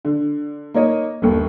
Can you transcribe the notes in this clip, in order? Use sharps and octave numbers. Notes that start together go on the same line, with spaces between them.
D3
A#3 D#4 C#5 D#5
G1 D#2